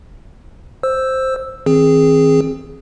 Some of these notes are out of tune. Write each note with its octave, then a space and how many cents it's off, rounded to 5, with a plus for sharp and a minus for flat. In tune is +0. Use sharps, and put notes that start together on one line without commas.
C5 +5 E6 +0
D#3 +40 C4 +15 G#4 +0